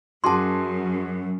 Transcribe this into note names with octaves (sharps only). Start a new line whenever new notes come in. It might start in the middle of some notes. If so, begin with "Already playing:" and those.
F#2 F#4 G#4 A5 C6 D6